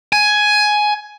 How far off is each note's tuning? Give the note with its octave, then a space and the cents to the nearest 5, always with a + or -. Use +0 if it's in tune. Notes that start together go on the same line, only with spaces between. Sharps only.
G#5 +10